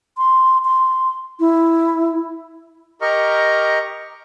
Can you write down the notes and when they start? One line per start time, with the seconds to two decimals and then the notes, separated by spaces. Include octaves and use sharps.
0.18 C6
0.65 C6
1.40 E4
3.01 G4 A#4 D#5 A#5 C#6 F6